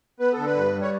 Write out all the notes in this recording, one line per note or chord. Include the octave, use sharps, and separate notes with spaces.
B3 B4
D3 A4
B4
G2
G3
C#5